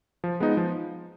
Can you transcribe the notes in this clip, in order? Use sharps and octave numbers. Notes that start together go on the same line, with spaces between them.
F3
G#3 B3 D#4
F3